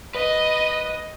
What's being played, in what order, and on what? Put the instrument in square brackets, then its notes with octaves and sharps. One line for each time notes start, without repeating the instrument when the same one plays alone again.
[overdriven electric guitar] B4 [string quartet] D#5